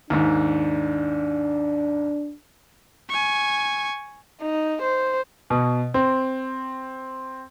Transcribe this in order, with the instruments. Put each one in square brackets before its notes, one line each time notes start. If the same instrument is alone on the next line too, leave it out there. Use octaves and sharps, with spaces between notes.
[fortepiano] D#2 G#2 [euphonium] D4
[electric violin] G#5 C#6
[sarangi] D#4
C5
[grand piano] B2
C4